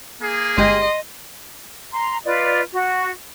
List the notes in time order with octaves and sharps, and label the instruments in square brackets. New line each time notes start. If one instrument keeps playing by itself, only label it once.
[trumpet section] A#3 G#4
[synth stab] G1 G#3 G4 [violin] D#5 [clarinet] C6
[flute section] A#5 C6
F4 B4 D5 D#5
F#4